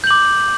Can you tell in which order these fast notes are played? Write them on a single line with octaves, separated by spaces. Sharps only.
G6 F#7 D6